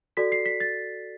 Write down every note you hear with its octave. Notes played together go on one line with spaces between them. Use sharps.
F#4 A4 D5 B6
C7
B6
A6